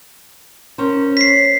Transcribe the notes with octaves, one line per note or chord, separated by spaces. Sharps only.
C#4 A#4 C5
B6 C7